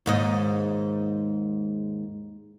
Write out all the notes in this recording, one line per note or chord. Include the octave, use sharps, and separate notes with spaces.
D#2 G#2 D#5